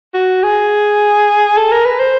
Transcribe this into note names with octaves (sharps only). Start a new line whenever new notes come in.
F#4
G#4
A4
A#4
B4
C5